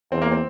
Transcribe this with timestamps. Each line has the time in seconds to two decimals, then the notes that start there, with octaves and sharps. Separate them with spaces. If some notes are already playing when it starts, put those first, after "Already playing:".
0.12 E2 C4
0.22 A#3
0.32 C4